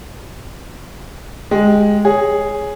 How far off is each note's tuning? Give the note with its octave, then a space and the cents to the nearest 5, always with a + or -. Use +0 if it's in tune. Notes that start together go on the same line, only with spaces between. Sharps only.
G#3 +0 G4 -10
G#4 +0 C#5 +0